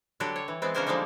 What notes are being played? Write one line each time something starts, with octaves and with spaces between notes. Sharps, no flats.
D3 F#3 G3 D4 F#4 G4
C#5
E3
E3 G#3 B3 C4
C#3 C#4 D4 A#4 C5 G#5
D3 F3 G3 G#3 A#3 D#4